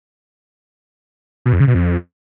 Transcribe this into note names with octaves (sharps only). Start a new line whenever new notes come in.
B2
F2
C#3
B2
F2